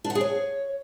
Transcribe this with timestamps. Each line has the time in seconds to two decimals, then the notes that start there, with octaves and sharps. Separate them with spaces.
0.04 D4
0.10 F#5
0.15 G#4
0.21 C#5